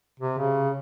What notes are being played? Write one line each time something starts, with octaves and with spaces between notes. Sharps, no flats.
C3
C#3